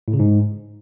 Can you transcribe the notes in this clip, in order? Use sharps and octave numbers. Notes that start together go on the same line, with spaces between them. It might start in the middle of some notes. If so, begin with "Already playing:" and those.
A2
C#3
G#2